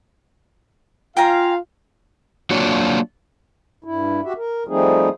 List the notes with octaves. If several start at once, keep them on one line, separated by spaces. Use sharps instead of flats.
F4 F5 G5 G#5 A#5
F#3 A#3 D4 F4 F#4 C#5
G2 E4
F#4 G4 E5
A#4
F3 G3 A3 C4 D#4 G#4